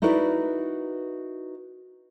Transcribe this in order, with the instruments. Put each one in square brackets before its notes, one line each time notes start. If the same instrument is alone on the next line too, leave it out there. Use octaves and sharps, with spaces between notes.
[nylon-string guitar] D#4 E4 F#4 A#4 B4 D5